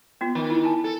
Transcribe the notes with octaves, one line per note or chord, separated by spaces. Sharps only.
B3 F4
D#3
E4
G#5 A5
A4